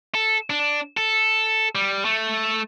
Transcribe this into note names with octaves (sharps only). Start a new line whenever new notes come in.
A4
D4
A4
G3
A3